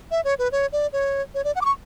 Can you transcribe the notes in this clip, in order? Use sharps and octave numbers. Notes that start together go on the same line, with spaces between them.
E5
C#5
B4
C#5
D5
C#5
C#5
D5
F#5
D6
C#6